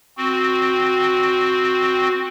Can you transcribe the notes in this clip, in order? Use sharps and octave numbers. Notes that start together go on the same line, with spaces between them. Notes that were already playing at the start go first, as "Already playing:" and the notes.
C4 F#4